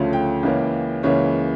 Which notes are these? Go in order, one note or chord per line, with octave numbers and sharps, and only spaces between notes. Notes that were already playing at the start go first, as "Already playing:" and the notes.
Already playing: D2 C#3 F3 A3 C#4
G5
C#2 C#3 E3 A#3 C#4
C#2 C#3 E3 A#3 C#4 C#5